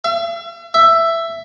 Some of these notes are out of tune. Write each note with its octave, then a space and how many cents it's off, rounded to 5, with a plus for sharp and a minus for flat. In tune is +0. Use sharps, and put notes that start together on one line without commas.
E5 +45
E5 +10